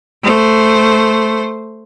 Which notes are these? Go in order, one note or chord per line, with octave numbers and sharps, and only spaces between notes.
A3 C5